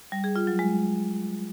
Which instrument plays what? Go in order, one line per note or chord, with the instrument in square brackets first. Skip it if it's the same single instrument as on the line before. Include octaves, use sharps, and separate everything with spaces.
[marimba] G3
G#4
F4
F#3
G#3